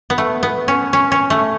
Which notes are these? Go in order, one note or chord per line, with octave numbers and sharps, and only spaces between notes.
B3
A3
B3
C#4
C#4
C#4
A3